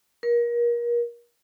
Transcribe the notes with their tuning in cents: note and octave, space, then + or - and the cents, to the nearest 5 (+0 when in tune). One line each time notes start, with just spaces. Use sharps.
A#4 +30